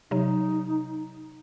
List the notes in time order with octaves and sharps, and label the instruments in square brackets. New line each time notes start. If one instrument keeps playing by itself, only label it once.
[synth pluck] C3 F#3 [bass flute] D#4